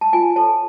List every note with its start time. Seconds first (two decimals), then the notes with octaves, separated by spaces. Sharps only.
0.01 A5
0.13 F4 G#5
0.36 A4 C#5 A5